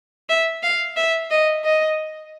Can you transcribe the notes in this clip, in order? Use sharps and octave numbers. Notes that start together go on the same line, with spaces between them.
E5
F5
E5
D#5
D#5